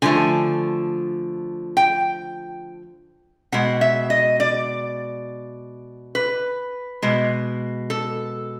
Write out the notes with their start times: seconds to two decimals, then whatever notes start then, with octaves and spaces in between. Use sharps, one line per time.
0.02 D3 F3 A3 G#5
1.77 G5
3.52 B2 G#3 F#5
3.81 E5
4.10 D#5
4.40 D5
6.15 B4
7.02 B2 G#3
7.90 A4